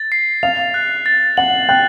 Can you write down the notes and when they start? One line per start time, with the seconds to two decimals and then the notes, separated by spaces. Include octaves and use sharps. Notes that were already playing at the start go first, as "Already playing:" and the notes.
Already playing: A6
0.12 C7
0.43 F5 F7
0.74 F#6
1.06 A6
1.37 F#5 F#7
1.69 G5 F#6